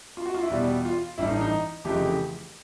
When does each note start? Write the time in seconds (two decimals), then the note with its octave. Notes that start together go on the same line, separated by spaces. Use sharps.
0.17 F4
0.26 F#4
0.35 F4
0.43 E4
0.50 E2 B2 G3
0.85 F4
1.18 A1 G2 E3 E4
1.29 D#4
1.41 D#4
1.85 F1 F2 C#3 E3 G4